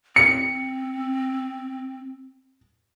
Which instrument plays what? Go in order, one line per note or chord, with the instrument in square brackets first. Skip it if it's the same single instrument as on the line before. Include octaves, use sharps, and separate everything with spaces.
[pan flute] C4 [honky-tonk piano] C#7